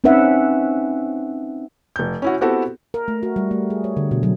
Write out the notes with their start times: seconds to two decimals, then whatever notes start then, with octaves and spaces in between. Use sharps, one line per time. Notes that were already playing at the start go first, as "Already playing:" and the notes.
0.04 C4 C#4 D#4 B4 E5 F#5
1.96 F1 G6
2.22 C#4 E4 F#4
2.41 B3 C4 E4 F#4 G4 A4
2.94 A#4
3.08 A3
3.23 F#4
3.36 G3
3.51 A3
3.70 G#4
3.84 C#5
3.97 D3
4.11 B2
4.23 F#3